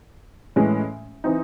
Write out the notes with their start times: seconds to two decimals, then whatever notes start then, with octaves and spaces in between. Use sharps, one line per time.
0.56 A2 E3 G#3 C#4
1.24 E3 C4 D#4